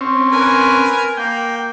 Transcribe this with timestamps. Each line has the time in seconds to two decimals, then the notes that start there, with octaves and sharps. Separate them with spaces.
0.01 C4 C#4
0.32 A#4 B4 G#5
1.17 A#3 G5